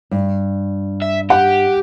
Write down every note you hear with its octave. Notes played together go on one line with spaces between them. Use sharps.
G2
E5
G4 F#5